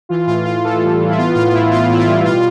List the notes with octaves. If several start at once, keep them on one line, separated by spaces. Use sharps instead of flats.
E3 F4
A2 F4
E3 F4
E3 A4
G3
E3
E4
B3 F4
A2 F4
A2 E4
A2 F4
A2 E4
F4
G3
B2 F4